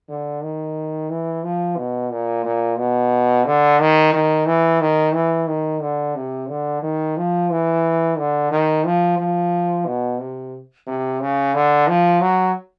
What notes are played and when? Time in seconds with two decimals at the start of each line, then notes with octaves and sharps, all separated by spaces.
0.08 D3
0.43 D#3
1.10 E3
1.43 F3
1.76 B2
2.11 A#2
2.44 A#2
2.78 B2
3.46 D3
3.79 D#3
4.13 D#3
4.46 E3
4.81 D#3
5.14 E3
5.48 D#3
5.81 D3
6.15 C3
6.49 D3
6.82 D#3
7.17 F3
7.50 E3
8.18 D3
8.51 D#3
8.85 F3
9.18 F3
9.85 B2
10.20 C3
10.87 C3
11.20 C#3
11.54 D3
11.88 F3
12.21 F#3